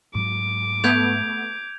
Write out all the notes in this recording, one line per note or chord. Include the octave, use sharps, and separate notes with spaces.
G#2 F#3 D6
A3 B3 G6 G#6 F7